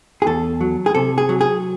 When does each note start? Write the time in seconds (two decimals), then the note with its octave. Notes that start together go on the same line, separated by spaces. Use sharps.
0.22 G#4
0.26 E2 A4
0.61 F#3
0.86 G#4
0.95 C3 A4
1.18 G#4
1.29 F#3
1.41 G#4